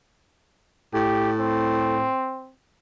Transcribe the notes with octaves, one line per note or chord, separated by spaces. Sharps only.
A2 G4
C4